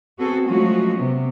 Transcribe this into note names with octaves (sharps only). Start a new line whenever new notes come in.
B3 C4 F#4 G#4 A4
F3 F#3 G#3 A3 C#4 F#4
C3 B3